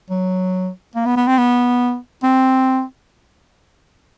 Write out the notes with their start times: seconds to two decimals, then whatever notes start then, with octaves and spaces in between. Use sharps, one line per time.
0.10 F#3
0.96 A#3
1.06 B3
1.16 B3
1.27 C4
1.38 B3
2.23 C4